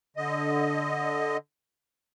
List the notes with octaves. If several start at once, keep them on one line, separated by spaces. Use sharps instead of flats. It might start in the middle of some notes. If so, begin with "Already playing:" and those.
D3 D#5